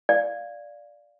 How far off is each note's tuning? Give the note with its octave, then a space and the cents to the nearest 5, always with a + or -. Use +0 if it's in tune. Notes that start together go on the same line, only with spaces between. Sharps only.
D5 +0 F5 +0